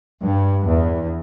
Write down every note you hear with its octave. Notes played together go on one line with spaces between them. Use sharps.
G2
E2